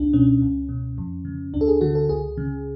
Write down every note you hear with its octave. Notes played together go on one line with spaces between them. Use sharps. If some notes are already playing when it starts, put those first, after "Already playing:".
Already playing: C#2 D4
B2 C#4
C#2
B2
F2
C#3
D2 D4
A4
G#4
D3 F#4
A4
C#2 G#4
C#3